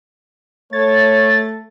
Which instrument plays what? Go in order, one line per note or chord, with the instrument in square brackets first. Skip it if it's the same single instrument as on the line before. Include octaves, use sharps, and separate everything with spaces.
[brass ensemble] A3 [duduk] C#5 [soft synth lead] A6